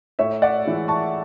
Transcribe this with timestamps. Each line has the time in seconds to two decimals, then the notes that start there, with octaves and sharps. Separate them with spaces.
0.19 A2 C#5 E5
0.42 D5 F#5
0.65 E3 G#3
0.88 A5 C#6